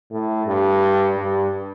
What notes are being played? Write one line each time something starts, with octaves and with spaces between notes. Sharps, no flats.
A2
G2
G2